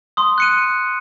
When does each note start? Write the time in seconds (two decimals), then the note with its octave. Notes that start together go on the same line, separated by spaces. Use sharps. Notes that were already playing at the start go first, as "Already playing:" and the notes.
0.17 C6 D#6
0.38 F#6 C#7 D#7